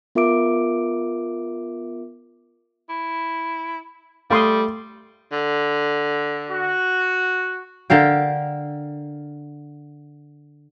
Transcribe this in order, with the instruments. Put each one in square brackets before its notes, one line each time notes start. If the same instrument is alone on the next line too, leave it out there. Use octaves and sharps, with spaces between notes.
[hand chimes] B3 F4 A#4 E5 D6 D7
[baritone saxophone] E4
[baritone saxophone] G3 [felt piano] A3 [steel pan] F5 C6 D#6
[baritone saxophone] D3
[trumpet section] F#4
[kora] D3 A#4 F5 G5